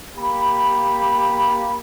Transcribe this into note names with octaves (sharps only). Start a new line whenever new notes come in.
A#3 G4 B5